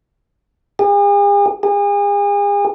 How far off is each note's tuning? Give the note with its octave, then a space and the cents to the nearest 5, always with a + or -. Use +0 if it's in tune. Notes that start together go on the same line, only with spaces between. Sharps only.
G#4 -45
G#4 -40